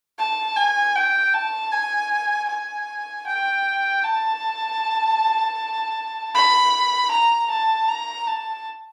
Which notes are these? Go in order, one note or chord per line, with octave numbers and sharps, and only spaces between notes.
A5
G#5
G5
A5
G#5
G#5
G5
A5
B5
A#5
A5
A#5
A5